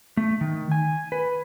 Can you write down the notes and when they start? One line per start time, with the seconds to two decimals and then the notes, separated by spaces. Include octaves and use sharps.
0.17 A3
0.41 D#3
0.72 G#5
1.12 B4